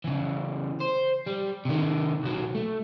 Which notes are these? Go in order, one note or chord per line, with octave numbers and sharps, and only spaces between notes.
C#3 E3
C5
G3
C3 D#3
C2 F#3
A3